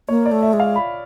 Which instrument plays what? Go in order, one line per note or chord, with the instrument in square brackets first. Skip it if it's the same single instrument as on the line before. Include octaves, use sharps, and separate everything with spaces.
[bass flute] A#3 [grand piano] C#5
[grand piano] D5
[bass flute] A3
[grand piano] E5
[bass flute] G#3
[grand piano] F5
B5